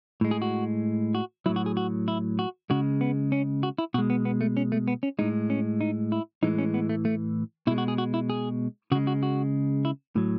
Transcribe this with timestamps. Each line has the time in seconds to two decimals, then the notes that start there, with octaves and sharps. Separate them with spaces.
0.21 A2 G#3
0.31 G#4
0.42 F#4
1.15 F#4
1.46 F#3 E4
1.48 A2
1.56 F#4
1.66 G#4
1.77 F#4
2.08 E4
2.39 F#4
2.70 C#3 G#3 F#4
3.01 B3
3.32 C#4
3.63 F#4
3.78 E4
3.94 B2 F#4
3.98 G#3
4.10 B3
4.25 B3
4.41 A3
4.57 C#4
4.72 A3
4.88 B3
5.03 C#4
5.19 A2 G#3 D#4
5.50 C#4
5.81 D#4
6.12 E4
6.43 A2 E3 G#3 D#4
6.58 C#4
6.74 B3
6.89 A3
7.05 A3
7.67 B2 E4
7.71 G#3
7.78 F#4
7.88 G#4
7.98 F#4
8.14 E4
8.30 G#4
8.92 C#3 F#4
8.95 G#3
9.07 F#4
9.23 F#4
9.85 E4
10.16 A2 F#3